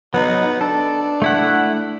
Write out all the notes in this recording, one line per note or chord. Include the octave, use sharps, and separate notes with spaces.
F#3 B3 D#4
D4 A4
A3 E4 F#5